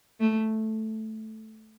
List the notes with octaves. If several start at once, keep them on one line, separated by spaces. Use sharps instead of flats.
A3